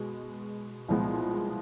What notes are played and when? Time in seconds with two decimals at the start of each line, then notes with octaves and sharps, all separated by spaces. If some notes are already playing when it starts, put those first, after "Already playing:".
Already playing: B2 G#3
0.88 C2 A#2 F3 G#3 B3